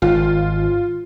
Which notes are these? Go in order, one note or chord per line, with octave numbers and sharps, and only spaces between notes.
G#1 F4